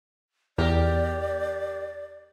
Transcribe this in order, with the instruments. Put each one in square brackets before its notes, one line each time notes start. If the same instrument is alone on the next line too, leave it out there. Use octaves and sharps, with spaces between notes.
[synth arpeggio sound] E2 [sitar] G4 A#4 [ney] D5